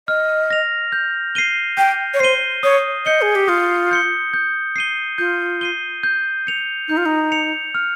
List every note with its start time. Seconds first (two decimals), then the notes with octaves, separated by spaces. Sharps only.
0.08 D#5 F6
0.50 A#6 F7
0.92 G6
1.35 C7 D#7 G7
1.77 G5 G6
2.14 C#5
2.20 C5 C7 D#7 G7
2.63 C#5 D#6
3.06 D#5 G6 C#7 G7
3.22 G#4
3.35 G4
3.48 F4 D#6
3.91 G6 C#7 G7
4.34 G6
4.76 C7 D#7 G7
5.18 F4 G6
5.61 C7 D#7 G7
6.03 G6
6.47 C#7 F7
6.88 D#4 G6
6.97 F4
7.06 D#4
7.32 C#7 F7
7.75 F6